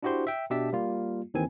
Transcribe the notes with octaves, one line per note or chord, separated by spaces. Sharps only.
D4 E4 F#4 G4 C5 C6
E5 G5
B2 D4 G4 E5 A5 B6
G3 A#3 F4
D#2 D#3 E3 C4 G#5